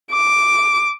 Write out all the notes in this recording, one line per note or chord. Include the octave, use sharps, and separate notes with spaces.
D6